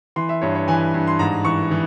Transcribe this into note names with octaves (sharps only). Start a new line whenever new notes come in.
E3 C6
E5
G2 C#5
C#5
E3 G#5
G2
C6
G#2 A#5
E3 C#6
E3